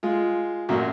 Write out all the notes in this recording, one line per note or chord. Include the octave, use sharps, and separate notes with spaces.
G#3 F4
A1 F#2 A#2 F#4